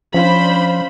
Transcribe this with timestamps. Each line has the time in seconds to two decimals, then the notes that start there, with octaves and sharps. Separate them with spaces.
0.14 F3 C#4 D4 C5 F5 B5